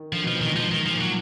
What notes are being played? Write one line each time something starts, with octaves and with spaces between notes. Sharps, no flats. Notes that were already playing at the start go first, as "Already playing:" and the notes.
Already playing: D#3
D3 F3
B2
F3
A#2
G#2 D#3
G#2 F3
D#3
A#2 F3
F#3